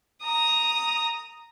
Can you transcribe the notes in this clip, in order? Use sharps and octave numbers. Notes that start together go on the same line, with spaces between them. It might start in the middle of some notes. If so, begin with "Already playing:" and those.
A#5 D#6